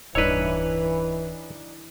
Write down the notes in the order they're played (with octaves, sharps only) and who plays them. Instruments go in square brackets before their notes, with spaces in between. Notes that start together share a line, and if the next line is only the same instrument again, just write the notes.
[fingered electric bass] D1 G2 [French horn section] E3 [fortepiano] D4 D#4 E6 [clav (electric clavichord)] B4 C#5